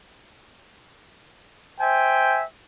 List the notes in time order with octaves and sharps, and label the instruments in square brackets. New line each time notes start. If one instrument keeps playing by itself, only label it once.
[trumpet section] C5 E5 G5 G#5